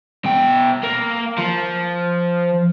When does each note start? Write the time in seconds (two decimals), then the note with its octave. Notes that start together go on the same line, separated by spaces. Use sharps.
0.25 B2 G5
0.83 A#3
1.38 F3